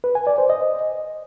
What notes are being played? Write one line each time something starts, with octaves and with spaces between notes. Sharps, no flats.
B4
G#5
D5
C5
D#5